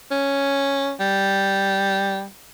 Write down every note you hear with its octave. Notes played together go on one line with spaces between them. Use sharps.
C#4
G3